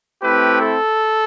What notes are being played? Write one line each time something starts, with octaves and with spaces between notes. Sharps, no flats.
A3 C4 E4 G4 B4
A4